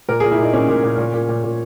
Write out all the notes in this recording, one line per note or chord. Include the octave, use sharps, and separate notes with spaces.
A#2 A#4
A#2 G#4
E4
A#2 D#4
A#2 C#4
A#2
A#2
A#2
A#2
A#2
A#2